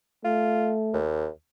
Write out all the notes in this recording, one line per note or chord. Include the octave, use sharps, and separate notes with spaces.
A3 F4
D#2